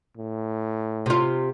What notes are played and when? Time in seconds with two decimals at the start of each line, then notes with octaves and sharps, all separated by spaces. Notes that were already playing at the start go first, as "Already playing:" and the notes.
0.17 A2
1.06 C3 F4